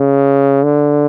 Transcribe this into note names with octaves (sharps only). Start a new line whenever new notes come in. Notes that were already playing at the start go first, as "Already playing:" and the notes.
Already playing: C#3
D3